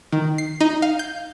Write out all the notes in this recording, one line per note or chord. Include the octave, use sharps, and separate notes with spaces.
D#3
C7
D#4
F5
G6